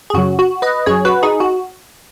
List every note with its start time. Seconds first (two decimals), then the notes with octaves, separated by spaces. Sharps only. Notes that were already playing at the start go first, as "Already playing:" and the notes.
0.10 G#4
0.14 F#2 C#3 F#3 F#4
0.39 F#4
0.62 B4 D#5
0.86 F#2 F#3 G#4 C#5
1.05 F#4 B4
1.23 D#4 G#4
1.40 F#4